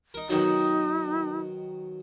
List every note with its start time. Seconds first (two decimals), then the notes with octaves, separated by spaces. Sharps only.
0.14 D#4 A#4
0.30 B2 D#3 F#3 D#4